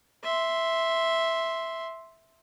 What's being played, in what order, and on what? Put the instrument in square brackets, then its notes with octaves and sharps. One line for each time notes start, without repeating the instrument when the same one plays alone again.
[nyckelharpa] E5 C6